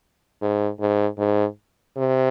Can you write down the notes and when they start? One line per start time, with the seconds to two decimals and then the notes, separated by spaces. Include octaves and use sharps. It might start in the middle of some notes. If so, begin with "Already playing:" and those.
0.42 G#2
0.80 G#2
1.18 G#2
1.97 C3